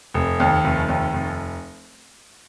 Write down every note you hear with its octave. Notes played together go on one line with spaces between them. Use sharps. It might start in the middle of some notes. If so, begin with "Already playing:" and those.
F1
D#2
F1
D#2
F1